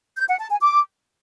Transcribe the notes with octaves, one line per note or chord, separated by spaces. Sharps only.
G6
F#5
A5
G#5
D6